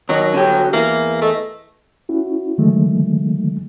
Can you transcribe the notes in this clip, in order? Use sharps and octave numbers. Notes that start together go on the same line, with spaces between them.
D#2 F#3 D#5
D3 G4 C#5
F#4
E2 A#3 E5
A3 D#5
C#4 E4 F#4
D3 D#3 F#3 G#3 A3